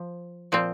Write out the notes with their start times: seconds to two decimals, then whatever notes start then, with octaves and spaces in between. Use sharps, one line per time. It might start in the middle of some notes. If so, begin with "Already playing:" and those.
Already playing: F3
0.52 A#2 F3 C4